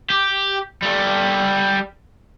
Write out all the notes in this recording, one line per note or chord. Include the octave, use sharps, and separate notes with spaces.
G4
G3 A4